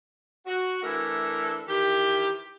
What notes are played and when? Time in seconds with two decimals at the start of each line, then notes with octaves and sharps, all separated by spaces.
0.46 F#4
0.83 E3 A3 D4 A4 A#4
1.68 D#3 E3 G4